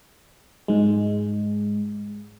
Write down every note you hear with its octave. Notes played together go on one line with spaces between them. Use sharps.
G#2 G#3